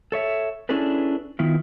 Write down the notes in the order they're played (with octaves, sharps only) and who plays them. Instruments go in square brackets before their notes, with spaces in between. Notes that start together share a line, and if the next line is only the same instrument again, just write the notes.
[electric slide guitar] A4 C#5 E5
C#4 D4 E4 G#4 A4 B4
D#3 B3 E4 F4